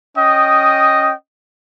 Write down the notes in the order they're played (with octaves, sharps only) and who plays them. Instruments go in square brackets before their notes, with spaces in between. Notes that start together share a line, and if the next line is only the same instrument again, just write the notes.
[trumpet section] C#4 D#5 G5 D#6